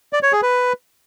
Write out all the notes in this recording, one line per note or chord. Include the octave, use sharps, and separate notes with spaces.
D5
C#5
G#4
B4